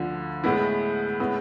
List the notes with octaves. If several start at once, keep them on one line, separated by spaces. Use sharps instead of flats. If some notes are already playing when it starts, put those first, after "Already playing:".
Already playing: D2 D3 F3
A2 G#3 B3 E4
A2 G#3 B3